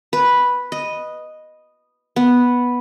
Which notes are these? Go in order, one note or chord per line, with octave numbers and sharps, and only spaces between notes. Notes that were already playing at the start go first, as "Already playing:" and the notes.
B4
D#5
B3